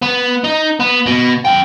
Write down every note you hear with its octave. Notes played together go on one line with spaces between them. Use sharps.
B3
D#4
B3
B2
F#2 G5